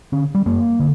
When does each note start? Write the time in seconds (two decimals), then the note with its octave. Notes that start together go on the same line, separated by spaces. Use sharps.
0.12 D3 C#4
0.35 G3
0.46 F#2 A#3
0.79 D3